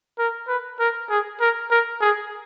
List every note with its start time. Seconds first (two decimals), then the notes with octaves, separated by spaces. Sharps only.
0.19 A#4
0.48 B4
0.79 A#4
1.10 G#4
1.41 A#4
1.71 A#4
2.01 G#4